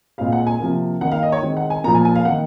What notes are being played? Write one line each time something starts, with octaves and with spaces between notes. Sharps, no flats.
A#2 G#3 C4 F5
F#5
G#5
C3 F3 A#3
D#3 A#3 F#5
F5
D#5
C#5
D#3 G#3 C4
F#5
G#5
A#2 F3 A#3 A#5
G#5
G#5
F5
D#3 A#3 F#5